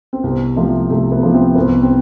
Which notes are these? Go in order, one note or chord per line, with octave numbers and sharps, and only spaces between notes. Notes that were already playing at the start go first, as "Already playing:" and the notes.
C4
C2 B3
C3 F3 A3
C2 A3
B3
C3 F3 A3
C4
C2 B3
C4